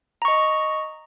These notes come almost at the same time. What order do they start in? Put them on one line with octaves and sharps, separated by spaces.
A#5 C#6 D#5